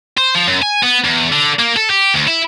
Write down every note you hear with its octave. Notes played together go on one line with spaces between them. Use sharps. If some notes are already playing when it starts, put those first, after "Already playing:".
C5
F3
F#2
G#5
B3
E2
D3
A#3
A4
G4
D2
E4